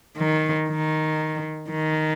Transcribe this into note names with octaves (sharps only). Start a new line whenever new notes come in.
D#3
D#3
D#3